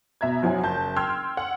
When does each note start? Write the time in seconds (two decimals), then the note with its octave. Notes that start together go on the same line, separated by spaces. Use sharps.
0.21 B2 E5 A#5 G#6
0.42 F#2 F3 F#3 E4 F#5 G#5
0.63 F#1 A5 G6
0.96 G5 C6 E6 F6 G#6
1.37 F#5